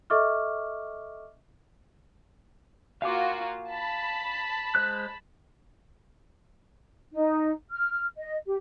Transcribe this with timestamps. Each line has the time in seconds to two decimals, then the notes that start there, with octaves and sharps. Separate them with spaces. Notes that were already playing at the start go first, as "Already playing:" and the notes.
0.10 A4 D#5 E5 C#6 D6 F6
3.02 A#3 F4 F#4 F5 G#5 D6
3.69 A5 B5
4.75 G#3 C5 F#6
7.13 D#4
7.71 F6
8.17 D#5
8.47 G4